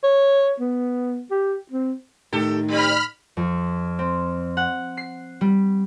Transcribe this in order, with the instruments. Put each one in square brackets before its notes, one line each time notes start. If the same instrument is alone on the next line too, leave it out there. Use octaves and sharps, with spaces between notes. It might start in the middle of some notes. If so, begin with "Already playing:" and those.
[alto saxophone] C#5
B3
G4
C4
[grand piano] A2 [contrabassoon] D#3 [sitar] G4 A4
[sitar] G3 C4 [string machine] B5 F6
[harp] F2
C4
F#5
C7
G3